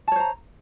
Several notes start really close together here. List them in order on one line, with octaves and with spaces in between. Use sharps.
A5 C#5 C5 A#5